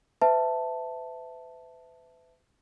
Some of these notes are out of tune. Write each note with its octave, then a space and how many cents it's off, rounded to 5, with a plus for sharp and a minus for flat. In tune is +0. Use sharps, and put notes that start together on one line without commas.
B4 +40 E5 +0 A5 +5